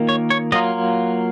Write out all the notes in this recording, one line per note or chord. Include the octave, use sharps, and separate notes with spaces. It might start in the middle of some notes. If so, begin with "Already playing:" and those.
Already playing: D#3 A#3 F4
C#5
C#5
F#3 A#3 F4 D#5